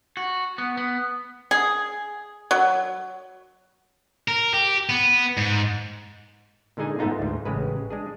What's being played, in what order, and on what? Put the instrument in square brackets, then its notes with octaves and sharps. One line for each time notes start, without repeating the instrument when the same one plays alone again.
[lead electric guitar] F#4
B3
B3
[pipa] G#4
F#3
[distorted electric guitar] A#4
G4
B3
G#2
[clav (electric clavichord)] A#2 D3 G#3 D#4 G#4 G#5
G#2 A3 B3 D#4 F4
D2 G#2
A1 C#3 G#3 B4
G#3 D4 G#4